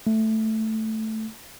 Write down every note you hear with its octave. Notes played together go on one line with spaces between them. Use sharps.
A3